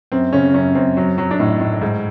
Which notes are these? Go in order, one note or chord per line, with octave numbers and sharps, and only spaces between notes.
F#2 C4
C#3 C#4
F#2 C#4
F#2 C4
F#3
F#3
D4
A2 D#4
A2
G#2